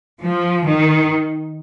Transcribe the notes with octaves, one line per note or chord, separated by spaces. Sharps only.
F3
D#3